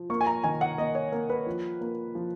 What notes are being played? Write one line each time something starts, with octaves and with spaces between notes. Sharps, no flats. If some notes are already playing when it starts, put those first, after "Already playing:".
Already playing: F3
A#3 C#6
G#5
A#5
D#3 G#5
F#5
A#3 D#5
C#5
A#3 A#4
B4
F3
A#3
F3